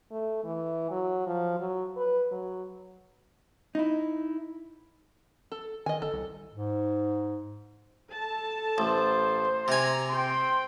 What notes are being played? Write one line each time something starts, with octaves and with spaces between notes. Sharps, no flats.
A3
E3
F#3
F3
F#3
B4
F#3
D#4 E4
A4
D#3 D#5 G#5
G1 A4
C2
G#2
A4 A5
A1 C5
C3 G#5 A#5
C4 G5 C6